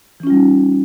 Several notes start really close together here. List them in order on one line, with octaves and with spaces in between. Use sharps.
E3 C#4 F4 G3 D#4